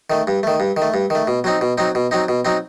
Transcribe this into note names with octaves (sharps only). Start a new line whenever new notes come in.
D#3 A3
G2
D#3 A3
G2
D#3
A3
G2
D#3 A3
B2
F#3 C4 D#4
B2
F#3 C4 D#4
B2
F#3 C4 D#4
B2
F#3 C4 D#4